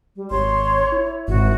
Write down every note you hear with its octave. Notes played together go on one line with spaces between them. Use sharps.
G3
G#1 C#5 C6
E4
G#1 F#4